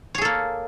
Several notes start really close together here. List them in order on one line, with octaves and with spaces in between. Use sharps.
C#5 G#4 A4 A#3